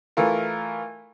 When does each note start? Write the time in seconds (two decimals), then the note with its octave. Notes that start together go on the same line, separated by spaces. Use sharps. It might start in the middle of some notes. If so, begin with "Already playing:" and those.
0.17 E3 A3 F4 A#4